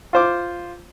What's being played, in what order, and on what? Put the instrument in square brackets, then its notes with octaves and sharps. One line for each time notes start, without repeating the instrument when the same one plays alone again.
[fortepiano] F4 C5 D6